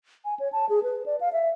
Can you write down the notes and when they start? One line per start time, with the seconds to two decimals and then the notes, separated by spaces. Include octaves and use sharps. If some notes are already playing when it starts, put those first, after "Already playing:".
0.25 G#5
0.40 C#5
0.53 A5
0.69 G#4
0.83 B4
1.06 D5
1.21 F5
1.33 E5